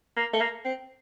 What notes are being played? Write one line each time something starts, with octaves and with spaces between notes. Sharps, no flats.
A#3
A3
A#3
C4